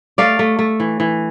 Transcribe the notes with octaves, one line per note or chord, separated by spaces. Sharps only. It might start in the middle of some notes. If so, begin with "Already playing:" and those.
A3 D5 F5
A3
A3
E3
E3